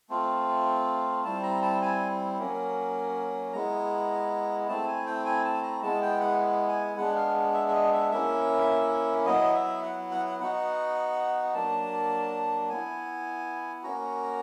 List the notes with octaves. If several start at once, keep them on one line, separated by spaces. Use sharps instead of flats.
A3 C4 F4
G3 C4 E4 A5
A#5
A5
G#5
F#3 A#3 C#4
G#3 B3 E4 A#5
A3 C4 E4 A5
G#5
G5
G#5
A5
A#5
G#3 B3 E4 A5
G5
F#5
G#5
G#3 B3 D4 F#5
F5
E5
E5
D#5
E5
A#3 C#4 E4 E5
F#3 B3 E4 D#5
E5
F#5
F#5
F#5
B3 D#4 F#4 F#5
F#3 A#3 D4 A5
B3 E4 G#5
A#3 C#4 F#4 A#5